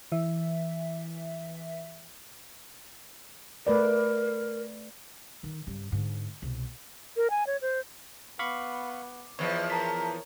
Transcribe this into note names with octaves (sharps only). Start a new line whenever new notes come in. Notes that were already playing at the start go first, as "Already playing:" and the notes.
E3 E5
A3 A#4 B4 D5
D#3
G2 C#3
G#2 D3
C2 B2
A#4
G#5
C#5
C5
B3 F5 B5 C#6 D6
E2 F3 B4 C#5 D#5
A#4 A5 A#5 B6